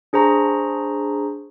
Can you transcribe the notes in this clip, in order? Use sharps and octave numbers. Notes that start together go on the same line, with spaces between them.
D4 G#4 C5 A#5 C#6